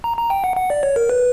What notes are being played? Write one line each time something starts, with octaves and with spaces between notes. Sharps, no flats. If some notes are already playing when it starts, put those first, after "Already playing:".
A#5
A#5
G5
F#5
F#5
D5
C#5
A#4
B4